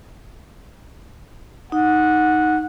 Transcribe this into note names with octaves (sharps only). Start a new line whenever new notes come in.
D#4 F#5